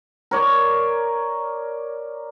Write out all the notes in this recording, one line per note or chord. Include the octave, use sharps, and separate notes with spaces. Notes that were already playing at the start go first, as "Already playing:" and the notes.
A#4 C#5 D5